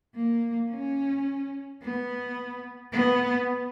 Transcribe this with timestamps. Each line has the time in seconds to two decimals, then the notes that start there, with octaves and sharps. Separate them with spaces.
0.16 A#3
0.71 C#4
1.82 B3
2.92 B3